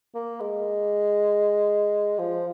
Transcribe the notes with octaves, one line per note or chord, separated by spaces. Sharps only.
A#3
G#3
F3